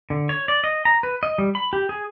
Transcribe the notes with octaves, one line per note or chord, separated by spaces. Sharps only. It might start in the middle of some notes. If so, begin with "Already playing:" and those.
D3
C#5
D5
D#5
A#5
B4
D#5
G3
B5
G4
G#4